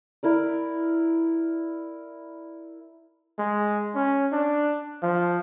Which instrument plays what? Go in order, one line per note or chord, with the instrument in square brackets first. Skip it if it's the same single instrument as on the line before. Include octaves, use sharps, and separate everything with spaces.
[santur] E4 A#4 D5
[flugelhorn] G#3
C#4
D4
F3